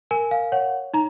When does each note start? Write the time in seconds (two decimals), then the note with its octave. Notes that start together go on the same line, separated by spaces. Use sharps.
0.11 A#4 G#5
0.31 F5
0.52 C#5 F#5
0.94 D#4 A#5